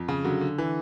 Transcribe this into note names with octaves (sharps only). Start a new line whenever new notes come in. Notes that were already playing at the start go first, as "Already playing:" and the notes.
Already playing: F2
C#3
D3 F#3
D3
E3